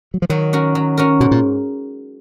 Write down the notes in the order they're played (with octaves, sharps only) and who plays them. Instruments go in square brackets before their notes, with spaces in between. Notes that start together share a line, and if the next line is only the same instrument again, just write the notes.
[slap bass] F#3
F3
[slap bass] D#3 [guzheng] F#3
[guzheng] C#4 F#4 A#4
F#3
C#4 F#4 A#4
[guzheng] G#2 [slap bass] B2
[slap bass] A#2